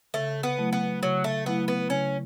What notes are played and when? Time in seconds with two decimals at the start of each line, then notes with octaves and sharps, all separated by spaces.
0.14 C#3 A3
0.43 B3
0.58 F#3 A3 E4
0.73 B3
1.03 C#3 F#3
1.24 A3
1.46 F#3 A3 B3 E4
1.68 B3
1.89 C#3 C#4